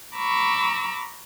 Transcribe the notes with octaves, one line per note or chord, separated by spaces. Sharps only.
A#5 B5 C#6 D6 E6